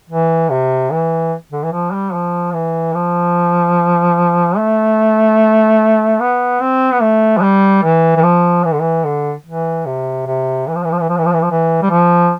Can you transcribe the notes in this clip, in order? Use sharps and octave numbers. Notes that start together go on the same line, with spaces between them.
E3
C3
E3
D3
E3
F3
G3
F3
E3
F3
A3
B3
C4
B3
A3
F3
G3
E3
E3
F3
E3
D3
E3
D3
E3
C3
C3
E3
F3
E3
F3
E3
F3
E3
F3
E3
F3
E3
G3
F3